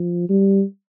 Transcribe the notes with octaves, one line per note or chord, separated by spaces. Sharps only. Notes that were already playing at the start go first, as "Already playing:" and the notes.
Already playing: F3
G3